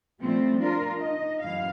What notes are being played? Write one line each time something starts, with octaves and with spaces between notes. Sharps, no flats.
F3 G3 A3 C4
D4 F4 A#4
D#4 D#5
F#2 E3 F5